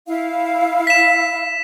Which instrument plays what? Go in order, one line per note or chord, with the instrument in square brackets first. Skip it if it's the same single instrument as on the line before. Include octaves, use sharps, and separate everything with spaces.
[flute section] E4 F5
[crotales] B6 E7